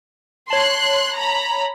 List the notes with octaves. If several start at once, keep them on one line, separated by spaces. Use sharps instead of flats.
C#5 A5 C6 F#6
A#5 B5